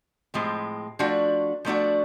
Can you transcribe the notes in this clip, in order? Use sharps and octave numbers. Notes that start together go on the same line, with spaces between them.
A2 F3 G#3 C4
F3 A3 D4 F#4
F3 A3 D4 F#4